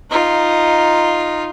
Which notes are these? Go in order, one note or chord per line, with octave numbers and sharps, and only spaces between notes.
D#4 F4